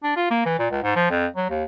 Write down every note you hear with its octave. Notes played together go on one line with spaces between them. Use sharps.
D4
F4
A#3
E3
A#2
C#2
G#2
F3
F2
F#3
D#2